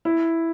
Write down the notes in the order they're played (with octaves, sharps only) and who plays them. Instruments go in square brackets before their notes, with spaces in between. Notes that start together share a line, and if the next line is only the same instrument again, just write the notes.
[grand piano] E4